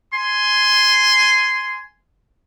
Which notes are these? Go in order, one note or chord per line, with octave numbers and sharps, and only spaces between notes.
G#5 C6